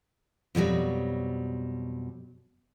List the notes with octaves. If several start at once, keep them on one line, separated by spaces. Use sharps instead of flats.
F2 B2 F#3 G3